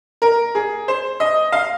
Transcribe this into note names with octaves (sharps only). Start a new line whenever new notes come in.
A#4
G#4
C5
D#5
F5